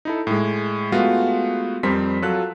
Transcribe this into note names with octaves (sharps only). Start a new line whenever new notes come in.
D#4 E4 A4
A2 G#3
G#3 A3 B3 F4 F#4
F2 G3 C4 A#4 C6 B6
F#3 F4 A4 F#6